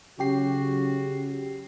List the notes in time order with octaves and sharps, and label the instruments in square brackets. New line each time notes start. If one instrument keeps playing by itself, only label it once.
[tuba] C#3 [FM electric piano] F#3 G4 C7 [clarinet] F#4